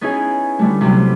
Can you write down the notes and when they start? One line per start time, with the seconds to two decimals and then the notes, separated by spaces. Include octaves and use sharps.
0.01 B3 C#4 D#4 E4 G#4
0.59 D3 G3 A3
0.81 C3 F#3 G3